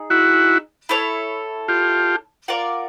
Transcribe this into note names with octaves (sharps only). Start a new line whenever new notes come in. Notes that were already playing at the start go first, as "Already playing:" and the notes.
Already playing: D#4 G#4
E4 F#4
E4 A4 C#5
F4 G4
F4 A#4 D5 F#5